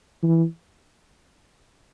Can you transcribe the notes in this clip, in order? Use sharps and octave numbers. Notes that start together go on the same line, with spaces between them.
E3